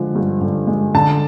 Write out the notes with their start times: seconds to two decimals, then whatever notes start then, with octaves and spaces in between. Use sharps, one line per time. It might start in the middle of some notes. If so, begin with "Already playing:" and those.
Already playing: D3 F3 G#3
0.16 G2
0.41 D3
0.67 G#3
0.95 D3 A5